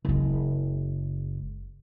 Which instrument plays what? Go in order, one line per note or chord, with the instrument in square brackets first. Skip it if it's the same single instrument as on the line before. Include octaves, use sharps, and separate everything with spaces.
[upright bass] F#1 G#3